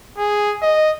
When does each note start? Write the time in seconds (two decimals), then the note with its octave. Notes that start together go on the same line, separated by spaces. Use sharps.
0.18 G#4
0.62 D#5